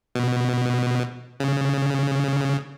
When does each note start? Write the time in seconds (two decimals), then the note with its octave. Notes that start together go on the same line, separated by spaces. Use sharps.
0.15 B2
1.40 C#3